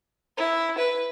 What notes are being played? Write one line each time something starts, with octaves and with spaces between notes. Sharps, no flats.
E4
B4